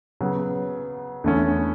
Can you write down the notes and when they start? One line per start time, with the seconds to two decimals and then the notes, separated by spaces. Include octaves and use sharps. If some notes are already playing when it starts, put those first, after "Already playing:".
0.21 C#3 F#3 B3
1.24 E2 D3 A3 C#4